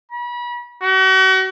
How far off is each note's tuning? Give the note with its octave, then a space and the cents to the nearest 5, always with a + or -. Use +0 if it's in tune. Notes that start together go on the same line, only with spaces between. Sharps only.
B5 -35
F#4 +40